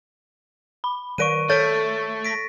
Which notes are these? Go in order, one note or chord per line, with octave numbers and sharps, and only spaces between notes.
B5
D#3 A#4 D5 C#6 D7 D#7
A3 A4 C#5 A6 D7
A#6 B6 D7